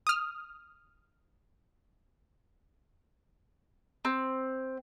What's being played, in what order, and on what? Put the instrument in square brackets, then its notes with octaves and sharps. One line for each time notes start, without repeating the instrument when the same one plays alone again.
[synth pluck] D#6 F6
[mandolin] C4